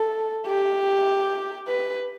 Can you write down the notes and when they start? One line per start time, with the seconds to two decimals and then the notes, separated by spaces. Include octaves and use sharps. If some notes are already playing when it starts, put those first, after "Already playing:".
Already playing: A4
0.46 G4
1.68 B4